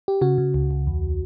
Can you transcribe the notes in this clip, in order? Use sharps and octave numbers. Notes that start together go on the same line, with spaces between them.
G4
C#3 F#4
C#3
C#2
C#2
E2